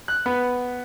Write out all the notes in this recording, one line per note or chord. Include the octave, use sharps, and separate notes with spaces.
F#6
B3